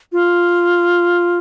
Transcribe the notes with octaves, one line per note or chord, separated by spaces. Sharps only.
F4